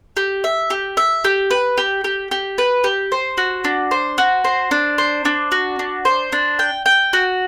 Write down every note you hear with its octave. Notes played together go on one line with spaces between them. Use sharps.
G4
E5
G4
E5
G4
B4
G4
G4
G4
B4
G4
C5
F#4
D4
C5
F#4
C5
D4
C5
D4
F#4
D4
C5
D4
G5
G5
F#4